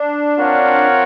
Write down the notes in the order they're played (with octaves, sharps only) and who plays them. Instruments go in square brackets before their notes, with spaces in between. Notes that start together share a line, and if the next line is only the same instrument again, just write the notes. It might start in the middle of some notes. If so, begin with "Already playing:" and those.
Already playing: [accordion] D4
[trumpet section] C4 F4 A#4 C#5 F#5